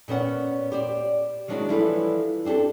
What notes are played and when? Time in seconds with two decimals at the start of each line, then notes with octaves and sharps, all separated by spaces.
0.08 A#2 B3 C#4 F#5
0.72 G4 C5 D5
1.48 D#3 F#3 G#3 D4 E4
1.68 E3 F3 G3 E4 A4 B4
2.45 C4 D4 F4 G4 A4